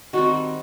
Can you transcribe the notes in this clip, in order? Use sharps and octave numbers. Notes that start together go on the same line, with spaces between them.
D#3 G3 C4 F#4